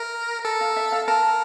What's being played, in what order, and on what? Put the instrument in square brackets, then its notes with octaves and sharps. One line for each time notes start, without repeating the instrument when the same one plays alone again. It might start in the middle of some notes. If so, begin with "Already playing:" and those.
Already playing: [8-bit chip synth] A#4 [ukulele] E5
[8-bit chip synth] A4
[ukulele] F5
E5
F5
[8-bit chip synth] A#4 [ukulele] A5